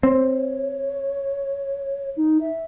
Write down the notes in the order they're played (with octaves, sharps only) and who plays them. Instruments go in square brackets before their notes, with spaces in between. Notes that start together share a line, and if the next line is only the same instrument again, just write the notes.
[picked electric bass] C4 [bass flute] C#5
[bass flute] D#4
E5